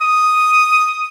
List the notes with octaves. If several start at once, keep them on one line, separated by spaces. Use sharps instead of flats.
D#6